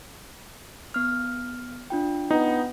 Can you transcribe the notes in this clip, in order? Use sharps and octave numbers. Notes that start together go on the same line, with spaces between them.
B3 F6
D4 F4 G5
B3 D#4